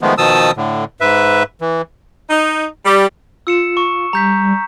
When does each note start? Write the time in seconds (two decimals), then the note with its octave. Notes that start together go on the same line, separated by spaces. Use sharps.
0.01 D#3 F3 G#3 A3 B3
0.18 B2 D#3 F3 A5 D#6 E6
0.57 A2 D3
1.01 G#2 B4 E5
1.61 E3
2.30 D#4
2.86 G3
3.47 F4 E6 C#7 E7
3.77 C#6
4.13 G3 A#5 G6 B6